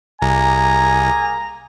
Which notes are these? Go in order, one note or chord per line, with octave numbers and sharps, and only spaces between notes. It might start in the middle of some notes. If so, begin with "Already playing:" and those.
C2 A#3 G#4 G#5 A#5